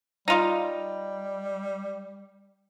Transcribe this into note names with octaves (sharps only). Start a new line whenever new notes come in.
G3 D#4 F4